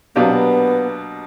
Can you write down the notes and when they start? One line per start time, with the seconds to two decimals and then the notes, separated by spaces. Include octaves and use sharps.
0.15 B2 F#3 A#3 B3 D4 G4
0.24 C4
0.31 B3